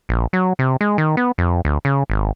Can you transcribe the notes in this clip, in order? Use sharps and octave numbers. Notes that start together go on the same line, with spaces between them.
A#1
F#3
C3
G#3
D#3
B3
F2
D2
C#3
G#1